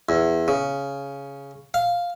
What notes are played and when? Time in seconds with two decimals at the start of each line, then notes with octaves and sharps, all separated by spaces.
0.09 E2
0.48 C#3
1.74 F5